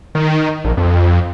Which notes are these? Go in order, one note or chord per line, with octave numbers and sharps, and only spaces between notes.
D#3
A#1
F2